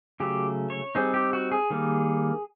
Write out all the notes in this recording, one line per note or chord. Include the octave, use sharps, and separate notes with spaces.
C#3 F#3 A3 G4
C#5
G3 C4 D#4 G#4
G4
F#4
G#4
D#3 G3 A#3